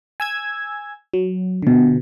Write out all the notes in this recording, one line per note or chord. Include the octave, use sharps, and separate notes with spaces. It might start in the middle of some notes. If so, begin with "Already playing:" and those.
G#5 E6 G#6
F#3
B2 D3